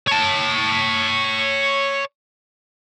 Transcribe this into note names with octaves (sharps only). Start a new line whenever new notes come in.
C#5 A5